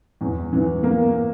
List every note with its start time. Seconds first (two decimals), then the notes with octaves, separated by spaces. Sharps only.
0.21 E2
0.53 E3
0.83 A#3